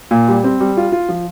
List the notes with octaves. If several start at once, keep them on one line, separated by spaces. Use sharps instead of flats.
A#2
G3
C4
G3
F4
F4
F3